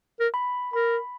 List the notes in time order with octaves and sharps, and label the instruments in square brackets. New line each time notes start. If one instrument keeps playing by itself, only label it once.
[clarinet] A#4
[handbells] B5
[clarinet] A#4 [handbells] B5